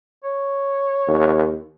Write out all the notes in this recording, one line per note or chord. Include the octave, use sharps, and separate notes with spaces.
C#5
D#2